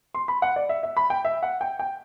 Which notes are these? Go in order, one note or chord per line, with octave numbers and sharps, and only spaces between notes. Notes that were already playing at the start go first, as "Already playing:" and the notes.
C6
B5
F#5
D5
E5
E5
B5
G5
E5
F#5
G5
G5